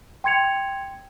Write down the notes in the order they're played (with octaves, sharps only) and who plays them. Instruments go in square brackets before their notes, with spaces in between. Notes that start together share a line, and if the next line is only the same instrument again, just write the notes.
[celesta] G5 C6 G#6 C#7 F7